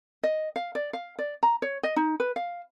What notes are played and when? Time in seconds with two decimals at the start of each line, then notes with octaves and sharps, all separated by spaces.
0.23 D#5
0.56 F5
0.75 D5
0.93 F5
1.19 D5
1.43 A#5
1.62 C#5
1.83 D#5
1.96 D#4
2.20 B4
2.36 F5